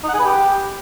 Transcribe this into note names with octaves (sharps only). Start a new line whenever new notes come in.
D#4
F#5
G#4
B4
G4